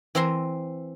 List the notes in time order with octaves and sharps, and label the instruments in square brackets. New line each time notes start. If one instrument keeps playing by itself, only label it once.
[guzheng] E3 C4 E5 A#5 C6